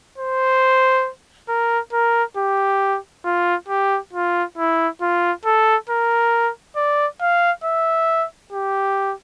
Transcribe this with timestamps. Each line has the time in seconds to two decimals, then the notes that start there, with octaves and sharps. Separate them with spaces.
0.18 C5
1.49 A#4
1.93 A#4
2.37 G4
3.25 F4
3.69 G4
4.13 F4
4.58 E4
5.02 F4
5.46 A4
5.90 A#4
6.76 D5
7.21 F5
7.64 E5
8.53 G4